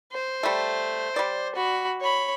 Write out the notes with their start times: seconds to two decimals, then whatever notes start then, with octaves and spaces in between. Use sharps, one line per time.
0.12 C5
0.43 G3 A3
1.16 G3 D5
1.55 F#4 B5
2.01 C#5 B5